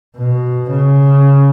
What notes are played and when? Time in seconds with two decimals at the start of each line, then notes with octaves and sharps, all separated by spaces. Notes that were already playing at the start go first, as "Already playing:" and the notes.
0.17 B2
0.71 C#3